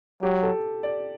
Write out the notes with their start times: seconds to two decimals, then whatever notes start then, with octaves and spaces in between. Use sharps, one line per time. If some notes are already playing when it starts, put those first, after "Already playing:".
0.22 F#3 G4
0.43 A4
0.83 D5